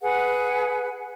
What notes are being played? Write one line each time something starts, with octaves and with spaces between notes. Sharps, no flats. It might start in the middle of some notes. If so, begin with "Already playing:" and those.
G#4 B4 F#5